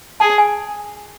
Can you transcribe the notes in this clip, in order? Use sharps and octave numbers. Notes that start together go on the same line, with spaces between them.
G#4 A5
G#5